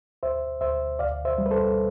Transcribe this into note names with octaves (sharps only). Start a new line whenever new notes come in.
D2 C5 E5
D2 C5 E5
D2 D5 F5
C5 E5
G3
B4
A4 C5